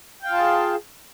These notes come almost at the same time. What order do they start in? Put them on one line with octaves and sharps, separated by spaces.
G5 F5 F4 A5 G#4